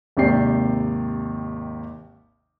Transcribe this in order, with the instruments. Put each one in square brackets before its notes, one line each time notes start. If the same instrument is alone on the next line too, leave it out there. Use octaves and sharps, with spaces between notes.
[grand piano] G#1 D#2 C3 G4 D5 C7